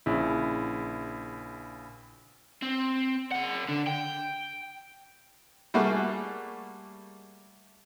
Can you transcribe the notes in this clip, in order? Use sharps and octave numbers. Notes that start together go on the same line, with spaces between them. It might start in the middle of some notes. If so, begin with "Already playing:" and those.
A#1 C#3 E4
C4
C#3 F#5
D3
G5
G3 A3 A#3 F#4 G#4